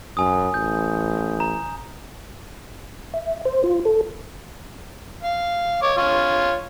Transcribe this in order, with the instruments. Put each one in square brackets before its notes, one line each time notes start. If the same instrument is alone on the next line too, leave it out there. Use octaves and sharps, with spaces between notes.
[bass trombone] F#2 [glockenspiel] G#5 D#6
[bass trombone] A1 [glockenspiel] G6
[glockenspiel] A#5
[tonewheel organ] E5
C5
F4
A4
[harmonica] F5
C#5 D6
F4 C#5 F6